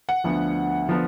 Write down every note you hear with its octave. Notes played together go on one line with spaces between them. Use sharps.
F#5
D2 D3 F3 B3
D3 F3 B3